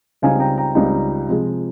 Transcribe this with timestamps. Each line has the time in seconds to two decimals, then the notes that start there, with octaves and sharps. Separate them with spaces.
0.22 C#2 C#3 G3 C4 D#4 F5 G#5
0.40 G5 A#5
0.58 G5 A#5
0.75 C#2 C#3 G3 C4 D#4
1.29 C3 F3 G#3